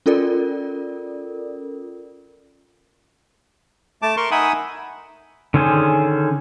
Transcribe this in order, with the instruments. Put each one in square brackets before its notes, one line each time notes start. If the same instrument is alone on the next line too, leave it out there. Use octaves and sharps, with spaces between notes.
[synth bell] C#4 F4 A4 A#4 D5
[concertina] A3 A5 D6
A#4 C6 C#6
D#4 E5 F#5 G#5 B5 D#6
[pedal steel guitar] D3 D#3 C#4 G#4 C5